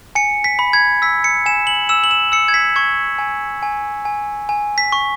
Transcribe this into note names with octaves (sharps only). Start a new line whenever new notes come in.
G#5 C#7
B6
B5
G#6
E6 B6
C#7
G#5 E7
F#7
E6 E7
F#7
E7
E6 C#7
G#6
B6
C#6 G#6
G#5
G#5
G#5
G#5
B6
C#6